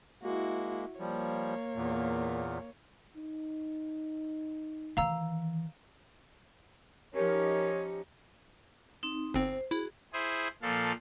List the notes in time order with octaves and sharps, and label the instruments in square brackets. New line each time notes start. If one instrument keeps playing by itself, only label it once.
[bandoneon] G#3 A#3 [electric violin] E4 F#4
[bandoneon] F3 G3 [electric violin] A#3 C#5
[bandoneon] E2 A#2
[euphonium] D#4
[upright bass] D#3 E3 [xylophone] F5 A#5 E6
[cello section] F3 C#4 D#4 [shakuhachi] G4 [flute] A#4 [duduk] C#5
[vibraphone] C4 D#4
[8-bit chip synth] G1 C4 [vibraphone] C5
[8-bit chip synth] E4 [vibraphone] F#4 G#4
[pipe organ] E4 G#4 C5
A#2 F3 A4 F5